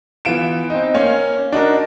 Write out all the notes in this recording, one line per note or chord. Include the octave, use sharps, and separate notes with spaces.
E3 B3 F4 D7 E7
C4 D#4
A#3 C#4 C#5
D4 D#4 F#4 A#4